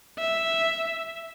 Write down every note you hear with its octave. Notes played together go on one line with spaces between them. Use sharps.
E5